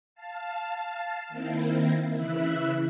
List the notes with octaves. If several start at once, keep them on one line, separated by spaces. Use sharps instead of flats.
F5 A5
D#3 A#3 C4 E4
C#3 E3 E4 E5 F#6